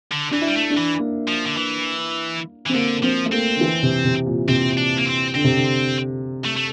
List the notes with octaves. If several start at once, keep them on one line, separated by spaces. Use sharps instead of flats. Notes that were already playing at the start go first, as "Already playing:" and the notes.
D3
E3 D4
E4
G3
A3
D4
E3
A#3
F3
D3
E3
E3
C4
D3 A#3
F3 C4
A3
A#3 C4
D3
E3
C3
C3
A#2
C3 C4
D4
A#3
C4
D3 C4
C3
D3
A3
A3